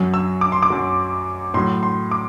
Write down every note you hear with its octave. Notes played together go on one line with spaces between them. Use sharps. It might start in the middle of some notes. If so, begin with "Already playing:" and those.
Already playing: F#2 F#3
E6
D6
C6
D6
F#2 F#3
A2 F#3 C6
C6
D6